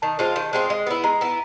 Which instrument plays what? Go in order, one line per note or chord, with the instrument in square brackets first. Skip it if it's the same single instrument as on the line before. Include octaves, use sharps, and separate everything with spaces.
[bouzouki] D#3 [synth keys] A5
[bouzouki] G#3 C4 F4
D#3
G#3 C4 F4
G#3
B3 E4
[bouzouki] G#3 [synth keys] A#5
[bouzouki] B3 E4